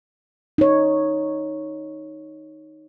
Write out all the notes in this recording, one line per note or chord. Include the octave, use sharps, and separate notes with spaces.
D#4 C#5